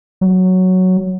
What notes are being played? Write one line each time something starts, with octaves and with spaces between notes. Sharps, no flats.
F#3